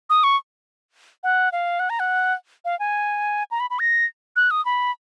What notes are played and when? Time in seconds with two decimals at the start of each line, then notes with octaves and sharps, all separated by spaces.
0.10 D#6
0.24 C#6
1.23 F#5
1.52 F5
1.80 F#5
1.90 A#5
2.00 F#5
2.65 F5
2.79 G#5
3.51 A#5
3.60 B5
3.70 B5
3.79 A#6
4.36 F#6
4.51 D#6
4.65 B5